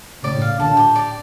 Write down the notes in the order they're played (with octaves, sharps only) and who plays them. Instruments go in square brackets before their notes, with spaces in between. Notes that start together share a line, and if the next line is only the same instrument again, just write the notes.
[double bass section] A2 C#3 [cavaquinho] D5
[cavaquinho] F5
[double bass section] A#2 D3 [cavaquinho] A5
[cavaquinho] G4
D5